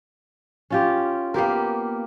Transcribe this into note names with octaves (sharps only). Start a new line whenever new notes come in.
C#4 F4 G4
A#3 B3 G4 A#4